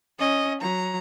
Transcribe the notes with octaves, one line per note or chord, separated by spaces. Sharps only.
C#4 D#5
F#3 A#5